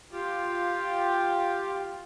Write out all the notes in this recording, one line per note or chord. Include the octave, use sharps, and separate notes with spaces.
F4 G4